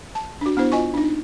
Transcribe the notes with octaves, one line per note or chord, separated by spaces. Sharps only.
A5
D4 F#4
B3 D4 E4 C5
F4 D#5 G#5 C#6
D4 D#4